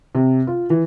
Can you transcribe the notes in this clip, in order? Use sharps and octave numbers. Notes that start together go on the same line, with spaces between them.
C3
F4
E3